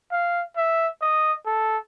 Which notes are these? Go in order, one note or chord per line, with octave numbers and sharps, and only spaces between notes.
F5
E5
D#5
A4